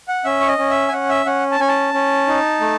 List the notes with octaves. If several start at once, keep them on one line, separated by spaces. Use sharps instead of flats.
F#5
C#4 E5
C#5
D#5
C#4
E5
G#5
C#4 F#5
E5
C#4 F#5
A5
C#4 G#5
A5
C#4
D#4
A3